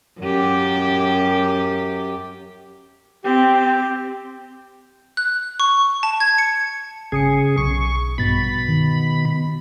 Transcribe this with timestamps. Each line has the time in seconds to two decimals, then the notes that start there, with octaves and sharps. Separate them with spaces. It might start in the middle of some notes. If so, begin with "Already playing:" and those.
0.20 F#2 G4
3.24 C4 G4
5.17 F#6
5.60 C#6
6.03 A5
6.20 G#6
6.38 C#7
7.12 G1 C#3 G#4 D#6 C#7
7.58 B1 C#6
8.18 A#1 G2 B2 B5 A6
8.68 D#3